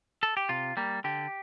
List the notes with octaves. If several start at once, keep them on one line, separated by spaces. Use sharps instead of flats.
A4
G4
C3 F4
G3 A#3
D3 G4